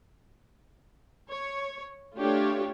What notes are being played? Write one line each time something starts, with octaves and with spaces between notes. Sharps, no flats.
C#5
A3 D4 F4 G4 C#5